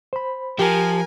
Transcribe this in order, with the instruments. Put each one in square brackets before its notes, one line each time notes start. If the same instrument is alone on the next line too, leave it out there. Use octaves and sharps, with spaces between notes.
[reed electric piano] C5 B5
[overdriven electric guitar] F3 [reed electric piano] G4 [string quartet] A#4 G#5